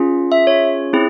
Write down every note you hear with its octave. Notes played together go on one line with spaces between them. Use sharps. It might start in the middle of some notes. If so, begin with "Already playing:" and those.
Already playing: C#4 F4 G#4
E5
C#5
C4 E4 G#4